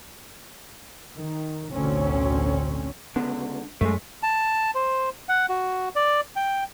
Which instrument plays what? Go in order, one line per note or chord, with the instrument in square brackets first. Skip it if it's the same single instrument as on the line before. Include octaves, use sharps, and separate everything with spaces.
[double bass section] D#3
A1 D2 B2 C4 C#4
[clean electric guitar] C#2 D3 [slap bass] B3
[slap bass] F#2 [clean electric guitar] G#3 A3
[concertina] A5
C5
F#5
F#4
D5
G5